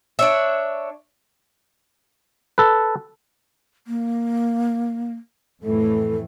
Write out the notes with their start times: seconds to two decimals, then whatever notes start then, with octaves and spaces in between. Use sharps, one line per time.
0.19 D4 C#5 E5
2.58 A4 B4
3.87 A#3
5.63 F2 A2 E3 A4